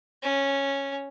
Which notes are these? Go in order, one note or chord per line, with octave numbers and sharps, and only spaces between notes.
C#4